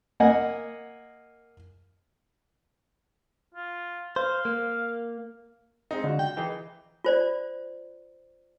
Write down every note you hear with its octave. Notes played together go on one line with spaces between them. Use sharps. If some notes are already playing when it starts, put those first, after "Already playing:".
A#3 D#5 F#5 G#5
F4
C5 F5
A#3
G#3 C4 D#4
D3 F4 F#4
G5
E3 D#4 G#4
F4 C5 D5